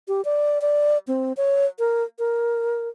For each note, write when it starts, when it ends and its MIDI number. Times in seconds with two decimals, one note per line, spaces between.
0.08 0.24 67
0.25 0.61 74
0.62 0.98 74
1.07 1.33 60
1.37 1.66 73
1.79 2.03 70
2.19 2.89 70